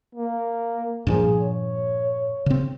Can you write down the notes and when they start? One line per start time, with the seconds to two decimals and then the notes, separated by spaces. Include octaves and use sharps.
0.15 A#3
1.07 G2 A#2 F3 G#4
1.41 C#5
2.46 C#3 C4